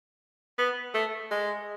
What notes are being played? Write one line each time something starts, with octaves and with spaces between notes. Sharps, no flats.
B3
A3
G#3